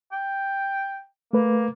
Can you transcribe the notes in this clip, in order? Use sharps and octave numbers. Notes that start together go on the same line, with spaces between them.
G5
A3 A#3 B4